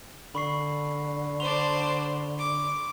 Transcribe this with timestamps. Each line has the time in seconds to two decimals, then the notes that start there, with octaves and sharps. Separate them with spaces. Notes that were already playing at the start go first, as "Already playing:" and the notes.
0.35 D3 B5 C#6 C7
1.40 D4 C5 C6 F7 G7
2.37 D6